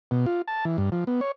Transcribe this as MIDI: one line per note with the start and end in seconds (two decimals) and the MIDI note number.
0.11 0.26 47
0.26 0.42 65
0.48 0.65 81
0.65 0.77 52
0.78 0.90 43
0.92 1.04 53
1.07 1.21 59
1.21 1.32 73